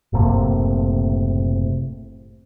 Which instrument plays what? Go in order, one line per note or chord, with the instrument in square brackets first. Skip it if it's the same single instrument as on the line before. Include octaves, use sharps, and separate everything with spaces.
[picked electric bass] F#1 A2 C3 A#3